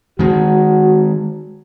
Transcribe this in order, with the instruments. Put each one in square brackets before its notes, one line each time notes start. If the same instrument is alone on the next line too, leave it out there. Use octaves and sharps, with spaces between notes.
[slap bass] D#3 G#3 [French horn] F#4